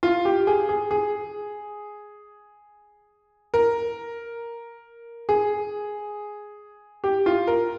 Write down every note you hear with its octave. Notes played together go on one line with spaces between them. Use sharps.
F4
G4
G#4
G#4
G#4
A#4
G#4
G4
F4
A#4